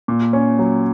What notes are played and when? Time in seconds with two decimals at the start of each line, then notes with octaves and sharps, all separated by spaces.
0.08 A#2
0.33 C#4
0.59 F#3